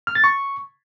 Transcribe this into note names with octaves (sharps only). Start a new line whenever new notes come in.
F6
A6
C#6